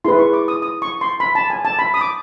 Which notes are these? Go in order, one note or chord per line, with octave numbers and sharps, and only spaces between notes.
E4 G#4 B4 C6
C#6
D6
D#6
D#6
C#6
C6
B5
A5
G#5
A5
B5
D#6
D6